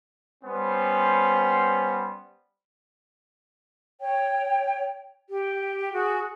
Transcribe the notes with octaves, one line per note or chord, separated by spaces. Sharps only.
G3 B3 C#4 C5
C#5 G5
G4
F#4 G#4